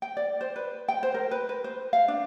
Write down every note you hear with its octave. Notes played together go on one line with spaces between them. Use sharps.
G5
D5
C5
B4
G5
C5
A#4
B4
B4
C5
F5
D4